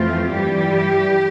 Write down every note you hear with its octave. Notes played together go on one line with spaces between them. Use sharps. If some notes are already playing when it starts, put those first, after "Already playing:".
Already playing: F2 E3 A3 C4 F4
G2 E3 G3 G4